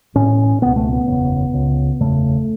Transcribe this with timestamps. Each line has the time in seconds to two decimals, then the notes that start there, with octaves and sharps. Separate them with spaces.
0.15 A1 A2 C#4
0.61 C#2 B2 B3
0.76 A3
0.93 B3
1.07 F#1 E2 C#3
1.54 C#2 C#3
1.99 F#1 E2 C#3 A3